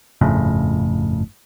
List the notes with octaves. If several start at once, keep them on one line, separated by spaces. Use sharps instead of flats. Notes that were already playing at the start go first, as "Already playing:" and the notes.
G1 F2 A2 C#3